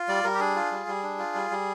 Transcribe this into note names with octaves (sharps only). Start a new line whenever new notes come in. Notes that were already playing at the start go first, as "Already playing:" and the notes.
Already playing: F4
G3 D5
G3 A#4
G4
D4 G#4
F4
G3
G3
D4
F4
G3
G3